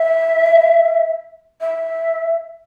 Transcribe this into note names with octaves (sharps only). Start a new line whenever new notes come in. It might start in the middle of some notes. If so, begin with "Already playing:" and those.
Already playing: E5
E5